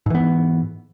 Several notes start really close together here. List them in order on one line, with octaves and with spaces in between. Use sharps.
G#2 E3 B3